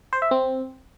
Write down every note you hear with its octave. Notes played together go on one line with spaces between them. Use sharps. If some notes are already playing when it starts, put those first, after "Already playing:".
C5
E5
C4